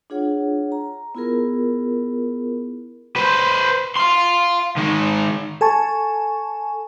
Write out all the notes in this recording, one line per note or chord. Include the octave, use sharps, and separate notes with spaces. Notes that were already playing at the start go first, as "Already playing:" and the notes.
D4 F4 G#4 C#5 F#5
A#5
B3 E4 F4 G#4 A#4
B4 C5
F5 C6
D#3 G#3
A4 G#5 A5 C#6